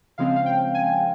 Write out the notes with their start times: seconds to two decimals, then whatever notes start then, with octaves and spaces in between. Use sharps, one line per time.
0.18 C#3 F3 G#3 C4 F5
0.36 F5
0.46 G5
0.74 G#5